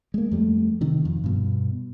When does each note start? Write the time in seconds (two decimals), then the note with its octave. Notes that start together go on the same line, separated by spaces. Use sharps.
0.14 G#3 A#3
0.31 F2 G3 A3
0.81 C3 D#3
1.05 F2
1.24 G2 B2